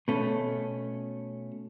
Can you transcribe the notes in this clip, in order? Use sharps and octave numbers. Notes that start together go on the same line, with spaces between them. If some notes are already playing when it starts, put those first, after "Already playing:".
B2 A3 C#4